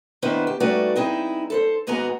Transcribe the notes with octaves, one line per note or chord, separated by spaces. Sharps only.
D#3 B3 D4 E4 B4 C5
G4
G3 A3 D#4 F#4 B4 D5
C4 D#4 E4 G#4
A4 B4 C5
D#2 G#2 B3 F#4 G#4 A#5